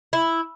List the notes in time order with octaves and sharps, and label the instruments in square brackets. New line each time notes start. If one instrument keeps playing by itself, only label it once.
[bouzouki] E4